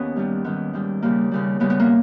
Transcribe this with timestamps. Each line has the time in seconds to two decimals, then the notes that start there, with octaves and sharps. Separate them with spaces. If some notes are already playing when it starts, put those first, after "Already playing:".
Already playing: D#2 B3 C#4 D#4 G4
0.16 G2 D#3 G3
0.45 G#2 D#3 G3 B3
0.73 G#2 D#3 G3
1.02 D#2 C#3 G3 A#3
1.32 D#2 C#3 G3
1.60 D#2 C#3 G3 B3
1.70 B3
1.80 A#3